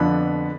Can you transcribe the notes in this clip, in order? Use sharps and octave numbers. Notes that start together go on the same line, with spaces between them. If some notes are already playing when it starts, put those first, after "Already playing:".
Already playing: F2 D3 F3 B3 D4 B5